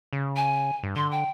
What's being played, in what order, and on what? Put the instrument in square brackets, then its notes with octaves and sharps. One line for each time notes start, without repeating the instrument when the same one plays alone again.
[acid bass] C#3
[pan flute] G#5
[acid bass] G2
[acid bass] D3 [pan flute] C6
[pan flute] G5